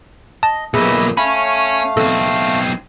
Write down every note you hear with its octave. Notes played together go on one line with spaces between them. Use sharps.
D#5 A5
B1 A#2 G#4 B4 D#5 E5
A3 C#4 F5 B5
B1 C4 A4